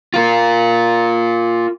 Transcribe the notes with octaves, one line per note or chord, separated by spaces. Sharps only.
F4 A#4